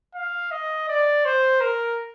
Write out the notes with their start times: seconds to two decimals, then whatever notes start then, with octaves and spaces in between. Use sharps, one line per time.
0.15 F5
0.51 D#5
0.89 D5
1.25 C5
1.61 A#4